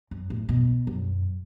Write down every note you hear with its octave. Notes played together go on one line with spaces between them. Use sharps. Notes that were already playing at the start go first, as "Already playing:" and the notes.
F#2
A2
B2
F#2